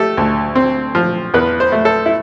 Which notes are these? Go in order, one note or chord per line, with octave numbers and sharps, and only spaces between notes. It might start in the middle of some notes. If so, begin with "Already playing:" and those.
Already playing: A3 G4 A4
D2
C4
F3
E2 B4
C5
A3
A4
E4